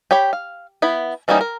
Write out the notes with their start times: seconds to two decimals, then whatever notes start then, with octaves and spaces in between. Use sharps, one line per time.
0.11 G4 C#5 G5 B5
0.33 F5
0.82 B3 E4 B5
1.28 E3 G3 A#3 C#4 D#4
1.41 A#4